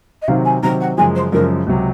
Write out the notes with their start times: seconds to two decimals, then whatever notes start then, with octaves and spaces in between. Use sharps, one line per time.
0.22 D#5
0.28 C3 D#3 F#3 C4 F5
0.45 G#5
0.63 C3 D#3 F#3 C4 A#5
0.81 F#5
0.98 F#2 C#3 F3 G#3 G#5
1.15 C5
1.32 F#2 C#3 F3 G#3 A#4
1.66 C#2 C3 F#3